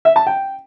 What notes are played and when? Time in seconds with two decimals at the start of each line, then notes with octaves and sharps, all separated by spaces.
0.05 E5
0.16 A5
0.27 G5